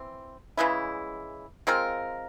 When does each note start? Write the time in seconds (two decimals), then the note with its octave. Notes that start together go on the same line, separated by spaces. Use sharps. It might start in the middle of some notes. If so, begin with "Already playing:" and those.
Already playing: E3 C4
0.57 C#3 E3 G#3 E4
1.67 G#3 C4 F4 A#4